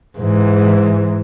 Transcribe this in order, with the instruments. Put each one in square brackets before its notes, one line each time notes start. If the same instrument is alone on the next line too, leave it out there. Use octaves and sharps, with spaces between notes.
[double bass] G#2 E3